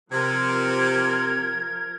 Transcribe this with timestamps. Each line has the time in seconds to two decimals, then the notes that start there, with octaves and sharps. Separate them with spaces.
0.11 C3 F3 A#4 G#6